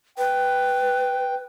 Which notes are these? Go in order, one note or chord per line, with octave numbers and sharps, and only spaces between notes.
B4 G5